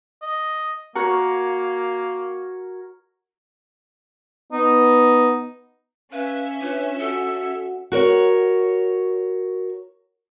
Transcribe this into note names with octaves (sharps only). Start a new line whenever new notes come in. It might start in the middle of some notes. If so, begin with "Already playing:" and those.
D#5
A#3 F#4 A#4 C#5
B3 D#4
C#4 B4 E5 F5
D4 F4 B4 C#5
F#4 A4 F#5
F#4 A#4 C#5